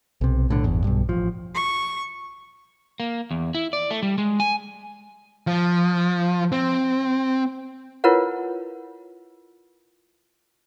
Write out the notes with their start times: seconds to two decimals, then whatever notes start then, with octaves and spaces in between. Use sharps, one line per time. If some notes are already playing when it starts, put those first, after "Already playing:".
0.21 B1 C3
0.49 B1 A2 D3
0.64 D1 G1 E2
0.84 B1 G2
1.09 A1 F3
1.55 C#6
3.00 A#3
3.31 E2
3.55 E4
3.73 D5
3.91 A3
4.03 G3
4.18 G#3
4.40 G#5
5.47 F3
6.52 C4
8.04 E4 F4 A#4 B4 C#5 F#5